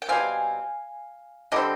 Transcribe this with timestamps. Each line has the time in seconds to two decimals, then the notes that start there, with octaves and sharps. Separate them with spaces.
0.02 G5
0.09 B2 G3 C4 F5 G#5
1.52 D3 G3 C4 D#5 G5